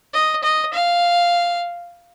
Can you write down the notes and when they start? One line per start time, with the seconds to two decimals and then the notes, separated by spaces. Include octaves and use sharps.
0.14 D#5
0.44 D#5
0.74 F5